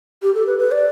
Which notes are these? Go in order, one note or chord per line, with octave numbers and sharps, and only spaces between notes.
G4
A4
B4
B4
D5